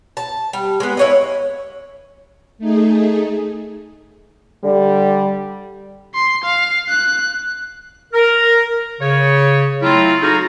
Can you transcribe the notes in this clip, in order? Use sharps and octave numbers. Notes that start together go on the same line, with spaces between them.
A5
G3
G#3 B3
E4 C#5 D#5
A3 D#4 G#4
D3 G3
C6
F5
F#6
A#4
C#3 C#5
F#3 A3 C4 E4 F4
D#4 F#4 G#4 A4 F5 A#5